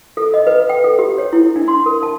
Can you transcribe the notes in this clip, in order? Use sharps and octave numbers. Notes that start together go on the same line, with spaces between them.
A4
D#5
B4
G5
A4
G4
C#5
E4
D4
C6
A#4
A5